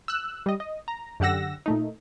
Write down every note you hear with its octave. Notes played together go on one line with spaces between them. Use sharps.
E6 F#6
G3 D#5
D#5
A#5
F#2 D3 G4 F#5 E6 A#6
A#2 A3 D#4